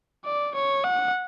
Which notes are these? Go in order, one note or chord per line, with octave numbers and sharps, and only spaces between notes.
D5
C#5
F#5